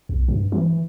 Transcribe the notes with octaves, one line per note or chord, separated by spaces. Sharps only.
B1
G2
E3